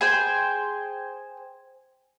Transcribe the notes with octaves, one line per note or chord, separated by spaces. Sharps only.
G#4 C5 G5